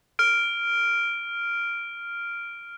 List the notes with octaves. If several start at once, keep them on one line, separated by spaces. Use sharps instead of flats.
F6 D7